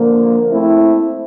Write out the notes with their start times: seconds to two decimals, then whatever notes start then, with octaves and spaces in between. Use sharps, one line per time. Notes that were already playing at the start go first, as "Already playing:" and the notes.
Already playing: D3 F3 A#3
0.50 A3 C4 E4